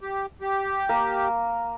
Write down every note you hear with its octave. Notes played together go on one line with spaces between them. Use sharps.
G4
G4
A#3 A#4